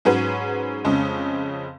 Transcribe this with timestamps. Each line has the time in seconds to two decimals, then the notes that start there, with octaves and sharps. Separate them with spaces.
0.05 G#2 F#3 C#4 G#4 B4
0.85 F2 C#3 G#3 C#4